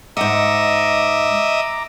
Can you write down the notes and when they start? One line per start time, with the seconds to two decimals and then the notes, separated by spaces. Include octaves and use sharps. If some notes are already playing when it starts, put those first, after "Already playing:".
0.17 G#2 D#5 E5 F#5 A#5 D6